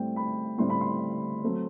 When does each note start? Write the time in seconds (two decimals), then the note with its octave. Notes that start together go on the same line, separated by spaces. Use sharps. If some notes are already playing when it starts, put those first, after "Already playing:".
Already playing: A2 G3 C4 G5
0.16 B5
0.58 A2 G3 C4 C6
0.70 B5
0.81 C6
1.43 F#3 A3 C4